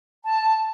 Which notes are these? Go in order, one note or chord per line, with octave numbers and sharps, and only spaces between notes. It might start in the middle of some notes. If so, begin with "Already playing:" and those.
A5